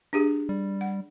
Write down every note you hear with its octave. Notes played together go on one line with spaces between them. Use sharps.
D4 G4 G#4
G3
F#5